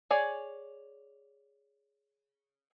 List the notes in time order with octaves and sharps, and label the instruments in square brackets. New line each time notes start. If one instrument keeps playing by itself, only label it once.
[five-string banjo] G#4 C#5 D5 G#5